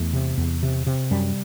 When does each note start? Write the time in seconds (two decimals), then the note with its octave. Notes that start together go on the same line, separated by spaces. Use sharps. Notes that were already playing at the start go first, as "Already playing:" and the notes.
Already playing: E2 A3
0.13 C3
0.38 E2
0.63 C3
0.87 C3
1.11 F#2 G3